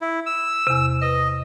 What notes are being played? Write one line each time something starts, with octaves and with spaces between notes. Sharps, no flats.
E4
E6
E2 C3
B4 D#5